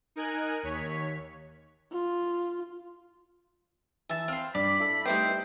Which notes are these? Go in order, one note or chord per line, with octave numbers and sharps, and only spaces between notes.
D#4 A#4 G#5 F#6
D#2 C#5 B6
F4
E3 E5 A5
C4 F5 C6 F6
G2 D4 D5 B5
E4 A4
G3 A3 B3 D#4 E4 C5 G5